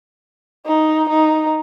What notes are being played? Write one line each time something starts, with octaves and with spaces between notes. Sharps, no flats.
D#4
D#4